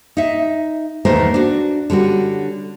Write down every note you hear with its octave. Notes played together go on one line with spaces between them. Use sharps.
D#4 E5
E2 D#3 A3 A#3 A#4 C5
D4 F#4
D3 G3 C#4 F#4